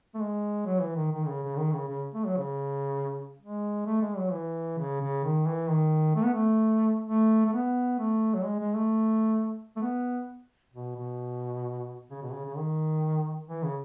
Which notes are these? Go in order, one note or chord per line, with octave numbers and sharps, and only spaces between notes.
A3
G#3
F#3
E3
D#3
D#3
C#3
C#3
D#3
C#3
C#3
A3
F#3
C#3
G#3
A3
G#3
F#3
E3
C#3
C#3
D#3
E3
D#3
A3
B3
A3
A3
A3
B3
A3
F#3
G#3
G#3
A3
A3
B3
B2
B2
C#3
B2
C#3
C#3
D#3
E3
C#3